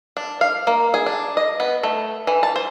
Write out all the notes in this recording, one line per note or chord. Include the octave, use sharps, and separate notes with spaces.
D4
F5
A#3
G#4
D4
D#5
B3
A3
E3
A5
C5